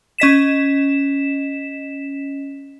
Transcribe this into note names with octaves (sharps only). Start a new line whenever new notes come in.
C#4 D#5 B6 E7